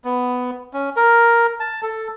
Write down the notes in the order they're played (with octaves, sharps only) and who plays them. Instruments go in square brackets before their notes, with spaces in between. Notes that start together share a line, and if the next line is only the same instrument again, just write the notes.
[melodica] B3
C#4
A#4
A5
A4